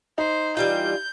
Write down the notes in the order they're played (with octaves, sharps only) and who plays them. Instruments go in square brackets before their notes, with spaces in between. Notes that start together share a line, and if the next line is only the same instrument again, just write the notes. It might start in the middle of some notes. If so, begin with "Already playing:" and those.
[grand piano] D#4 [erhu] C5
[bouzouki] E3 G3 F4 [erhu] G6